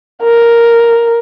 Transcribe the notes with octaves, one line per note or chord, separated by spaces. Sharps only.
A#4